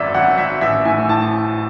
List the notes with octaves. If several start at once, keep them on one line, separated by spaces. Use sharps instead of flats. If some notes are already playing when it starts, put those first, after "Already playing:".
Already playing: G#1 F#2 D5 E5
G#1 F#5
G#1 E5
A1 E5
A2 G#5
A2 A5